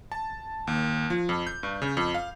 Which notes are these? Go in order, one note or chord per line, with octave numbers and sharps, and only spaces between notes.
A5
D#2
F3
F2
G6
G2
C#3
F2
F5